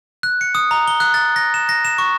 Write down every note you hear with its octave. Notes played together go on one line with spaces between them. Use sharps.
F#6
C#7
D#6
A#5
G7
F#6
A6
A#6
E7
A#6
E7
C#6